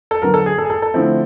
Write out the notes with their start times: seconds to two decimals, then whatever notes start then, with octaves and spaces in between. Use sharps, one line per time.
0.11 A4
0.22 D3 F#3 B3 A#4
0.34 A4
0.46 G#4
0.58 A4
0.65 G#4
0.70 A4
0.82 A4
0.94 D3 F3 A3 C4 E4